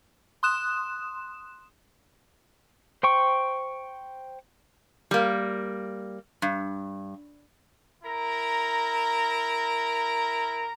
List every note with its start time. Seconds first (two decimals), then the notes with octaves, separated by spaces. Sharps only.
0.43 C6 D#6 F#6 E7
3.03 C5 G5 C#6
5.11 G3 A#3
6.42 G2
8.04 E4 A#4 A#5